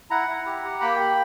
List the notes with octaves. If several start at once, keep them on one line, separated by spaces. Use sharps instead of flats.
E4 F#5 A#5
E4
G4
G4
A#3 G5 B5
G4